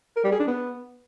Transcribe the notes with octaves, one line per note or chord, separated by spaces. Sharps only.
A#4
G3
G#4
D4
B3